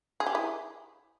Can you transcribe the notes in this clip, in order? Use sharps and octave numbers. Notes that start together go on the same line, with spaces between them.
G#4
G4
E4 G#4